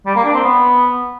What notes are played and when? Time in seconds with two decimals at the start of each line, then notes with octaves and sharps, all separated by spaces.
0.06 G3
0.16 A#3
0.25 D4
0.34 C4
0.44 B3